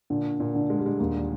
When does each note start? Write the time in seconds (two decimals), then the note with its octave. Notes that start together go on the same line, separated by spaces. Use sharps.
0.10 A#2 D3
0.40 A#2
0.54 D3
0.70 G#3
0.79 G3
0.86 G#3
0.99 D#2 A#3